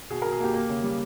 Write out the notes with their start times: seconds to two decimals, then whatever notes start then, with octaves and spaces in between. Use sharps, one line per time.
0.10 B2 G#4
0.22 B2 A#4
0.32 G#4
0.40 A#3 G4
0.54 A#3
0.69 C#3
0.83 G3